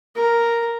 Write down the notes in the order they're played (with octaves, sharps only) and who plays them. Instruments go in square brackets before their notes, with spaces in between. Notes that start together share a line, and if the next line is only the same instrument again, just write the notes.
[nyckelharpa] A#4